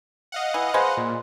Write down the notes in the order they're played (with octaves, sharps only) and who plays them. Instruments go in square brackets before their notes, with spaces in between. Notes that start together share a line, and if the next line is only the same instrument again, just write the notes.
[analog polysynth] D#5 F5 F#5
[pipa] E3
G#3 B4 C5
[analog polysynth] A#2